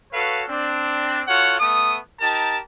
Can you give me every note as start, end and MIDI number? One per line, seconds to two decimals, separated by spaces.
0.12 0.43 66
0.12 0.43 69
0.12 0.43 71
0.12 0.43 73
0.12 0.43 77
0.48 1.22 60
0.48 1.22 62
1.28 1.57 65
1.28 1.57 66
1.28 1.57 69
1.28 1.57 73
1.28 1.57 78
1.59 1.97 57
1.59 1.97 59
1.59 1.97 87
2.21 2.57 63
2.21 2.57 67
2.21 2.57 70
2.21 2.57 81